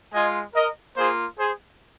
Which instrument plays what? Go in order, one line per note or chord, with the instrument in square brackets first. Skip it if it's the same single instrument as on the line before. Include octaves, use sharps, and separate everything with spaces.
[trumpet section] G#3 F4 D#5 G#5
A#4 D#5
A#3 F4 G#4 C5
G#4 C5